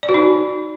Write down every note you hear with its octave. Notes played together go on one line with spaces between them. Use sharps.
D5
F#4
D#4